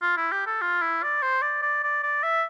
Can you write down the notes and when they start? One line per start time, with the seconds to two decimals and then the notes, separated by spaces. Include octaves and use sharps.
0.02 F4
0.17 E4
0.32 G4
0.46 A4
0.61 F4
0.82 E4
1.03 D5
1.22 C5
1.42 D5
1.62 D5
1.83 D5
2.03 D5
2.23 E5